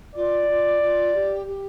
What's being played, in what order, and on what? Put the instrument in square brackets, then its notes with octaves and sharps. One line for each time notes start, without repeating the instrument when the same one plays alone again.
[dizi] F4 [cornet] D5
[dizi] F4
F4
G4
G4